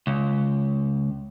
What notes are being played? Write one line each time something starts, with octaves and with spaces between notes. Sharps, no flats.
C#2